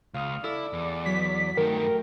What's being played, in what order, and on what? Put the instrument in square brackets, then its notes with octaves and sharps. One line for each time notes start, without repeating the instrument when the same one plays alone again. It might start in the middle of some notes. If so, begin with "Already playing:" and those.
[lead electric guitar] C#2 [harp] F5 D#6 F6
[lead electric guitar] E4 [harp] A4 E6 [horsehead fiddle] D5
[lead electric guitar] E2
[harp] F#3 [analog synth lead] B6
[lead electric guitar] G2 D#3 [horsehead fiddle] A3 G5 [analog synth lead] A#4